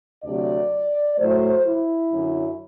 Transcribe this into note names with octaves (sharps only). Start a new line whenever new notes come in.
D2 C3 F#3 D5
A2 F#3 A3 C5
E4
F#2 D3 F#3